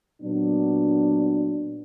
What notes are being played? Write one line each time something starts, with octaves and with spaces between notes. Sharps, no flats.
A#2 F#3 B3 D4